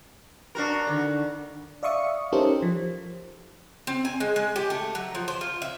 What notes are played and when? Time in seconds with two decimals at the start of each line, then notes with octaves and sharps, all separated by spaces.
0.55 D4 F#4 A#4
0.87 D3 D#3
1.83 D5 E5 F5 C#6 D#6 C#7
2.32 C#4 D#4 G4 A4 A#4 C5
2.62 F3
3.87 C4
4.05 G#5
4.20 G#3
4.36 G#3
4.56 G4
4.70 A3
4.95 F#3
5.15 F3
5.28 C5
5.41 F4
5.62 E5